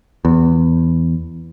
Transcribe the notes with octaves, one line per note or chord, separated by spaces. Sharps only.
E2